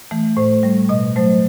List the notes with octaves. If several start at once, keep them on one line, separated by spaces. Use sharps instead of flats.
E3 A3
A2 C5
G3
B2 D#5
F#3 A3 C5